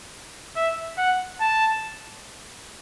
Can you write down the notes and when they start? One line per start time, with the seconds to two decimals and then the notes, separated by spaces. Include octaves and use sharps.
0.56 E5
0.98 F#5
1.40 A5